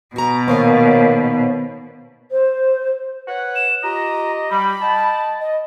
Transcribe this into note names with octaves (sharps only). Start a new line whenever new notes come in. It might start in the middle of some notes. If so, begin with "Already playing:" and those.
B2 F#4 A#5
A#2 D#3 A#3 B3 C5 C#5 F5
C5
B4 C#5 F#5
E7
F4 G4 D#5 A#5
G3 B5
D#5 G5 A5
D#5